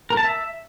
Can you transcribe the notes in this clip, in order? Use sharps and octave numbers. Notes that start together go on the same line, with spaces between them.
A#4
A5
E5